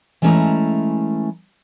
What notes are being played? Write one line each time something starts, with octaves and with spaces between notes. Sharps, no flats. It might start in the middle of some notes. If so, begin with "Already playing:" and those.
E3 G#3 A3 C#4 E4 A#5